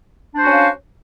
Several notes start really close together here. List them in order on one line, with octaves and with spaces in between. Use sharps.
D4 C5 F#4 C#4 F5